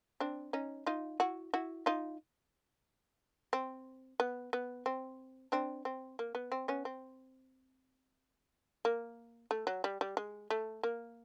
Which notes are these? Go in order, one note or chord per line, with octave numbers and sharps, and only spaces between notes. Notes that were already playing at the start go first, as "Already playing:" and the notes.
C4 D4
C#4 D#4
D#4 F4
E4 F#4
E4 F#4
D#4 F4
C4
B3
B3
C4
C4 D4
C4
A#3
B3
C4
B3 C#4
C4
A#3
A3
F#3
G3
G3
G#3
A3
A#3